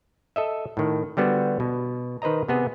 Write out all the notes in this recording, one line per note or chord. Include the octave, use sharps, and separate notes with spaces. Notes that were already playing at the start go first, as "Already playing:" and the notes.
A4 D#5 E5
A2 D#3
D3 G3 B3 F#4 C5
B2
D#3 B4 C5 D#5 A#5
C3 B3 G#4